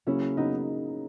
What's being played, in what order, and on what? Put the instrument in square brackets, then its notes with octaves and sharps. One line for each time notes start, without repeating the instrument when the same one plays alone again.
[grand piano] C#3 F#3 A#3 [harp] C#4 E4
[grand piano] C#3 F#3 [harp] B3 D#4